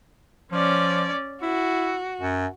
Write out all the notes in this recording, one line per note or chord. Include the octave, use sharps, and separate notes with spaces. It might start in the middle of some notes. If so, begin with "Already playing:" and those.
F3 C#4 D5
E4 F#4
F#2